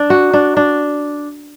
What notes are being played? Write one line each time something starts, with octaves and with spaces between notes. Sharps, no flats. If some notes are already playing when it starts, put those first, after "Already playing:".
Already playing: D4
F#4
D4
D4